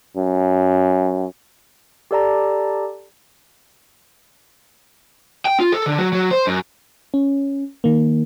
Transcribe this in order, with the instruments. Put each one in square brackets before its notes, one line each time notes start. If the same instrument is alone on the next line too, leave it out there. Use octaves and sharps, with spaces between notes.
[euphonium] F#2
[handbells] G4 A4 D5 A5 A#5
[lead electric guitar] G5
F4
A4
D3
F#3
F#3
C5
F#2
[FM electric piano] C#4
D#3 A#3